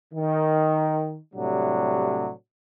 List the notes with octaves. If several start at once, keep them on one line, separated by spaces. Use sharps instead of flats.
D#3
A2 C3 F#3 G3 D4